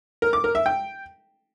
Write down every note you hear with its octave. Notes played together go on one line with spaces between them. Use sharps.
A#4
D6
A#4
E5
G5